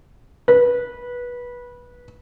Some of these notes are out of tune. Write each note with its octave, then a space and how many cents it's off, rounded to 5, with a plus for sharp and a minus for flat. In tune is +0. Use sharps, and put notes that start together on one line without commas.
B4 -20